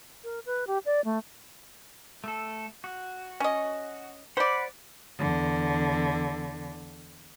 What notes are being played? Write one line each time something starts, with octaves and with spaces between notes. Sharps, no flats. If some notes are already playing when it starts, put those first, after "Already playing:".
A#4
B4
G4
D5
A3
A3 A4
F#4
C#4 D#5
C5 D5 F#5 B5
E2 D3